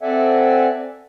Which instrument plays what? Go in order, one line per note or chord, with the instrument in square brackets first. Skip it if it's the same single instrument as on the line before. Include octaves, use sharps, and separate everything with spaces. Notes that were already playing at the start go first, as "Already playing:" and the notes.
[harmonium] C4 A4 D5 E5 F#5 G#5